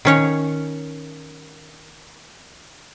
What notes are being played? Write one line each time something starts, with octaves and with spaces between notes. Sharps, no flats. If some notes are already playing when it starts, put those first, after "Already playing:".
D#3 C#4 C#5